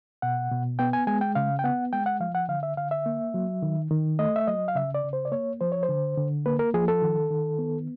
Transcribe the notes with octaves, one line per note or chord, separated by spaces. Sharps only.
B2 F#5
B2
B3 G5
G#5
G#3 G#5
G5
C#3 F5
G5
B3 F#5
G#3 G5
F#5
F3 F5
F#5
D3 F5
E5
D3 F5
E5
A#3
F#3
D#3
D#3
A3 D#5
E5
F#3 D#5
F5
C#3 E5
D5
C#3
C5
D5
A#3 C#5
F3 C5
C#5
C5
D3
D3
A#3 B4
A#4
F3 G#4
A4
D#3
D#3
B3